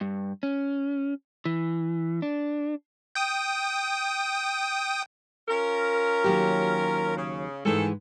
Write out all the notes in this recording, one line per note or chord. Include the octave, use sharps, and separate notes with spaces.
G2
C#4
E3
D4
G5 D#6
C#4 F4 A#4
D#2 F#3 G4
C#3
G#2 D#3 E3 G#3 A3 A4